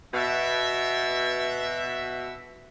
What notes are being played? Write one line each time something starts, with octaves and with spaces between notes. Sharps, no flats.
B2 E5